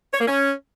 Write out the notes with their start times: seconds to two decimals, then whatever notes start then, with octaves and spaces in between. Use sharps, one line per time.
0.14 C#5
0.21 A#3
0.28 C#4